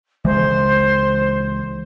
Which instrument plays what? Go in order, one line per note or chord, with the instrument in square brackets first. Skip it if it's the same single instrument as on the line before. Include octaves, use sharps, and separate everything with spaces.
[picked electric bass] C#2 E3 G#3 [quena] C5